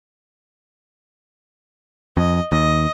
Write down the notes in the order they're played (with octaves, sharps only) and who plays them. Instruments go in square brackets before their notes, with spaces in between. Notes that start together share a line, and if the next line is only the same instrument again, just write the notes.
[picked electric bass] F2 [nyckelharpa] D#5
[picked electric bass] D#2 [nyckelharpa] D#5